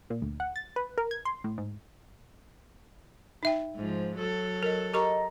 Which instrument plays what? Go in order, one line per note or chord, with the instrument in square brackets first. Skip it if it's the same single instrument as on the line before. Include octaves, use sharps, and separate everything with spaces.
[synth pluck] A#2
D2
F#5
A6
B4
A#4
G#6
C6
A2
G#2
[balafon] D#4 E5 G5
[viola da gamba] G#2 F3
F#3 A4
[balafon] A#4 D#5
[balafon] G4 A#4 C#6 [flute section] D#5 A#5